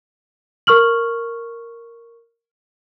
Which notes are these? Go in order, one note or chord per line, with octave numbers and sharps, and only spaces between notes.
A#4 C#6 F6 F#7